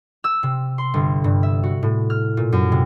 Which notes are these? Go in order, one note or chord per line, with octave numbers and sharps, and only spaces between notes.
E6
C3
C6
G1
G2
E5
F#4
A2
F6
A#2
F#2
C3